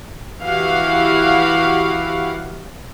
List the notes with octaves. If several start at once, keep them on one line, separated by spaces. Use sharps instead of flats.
E3 E4 F#4 G4 F5 F#5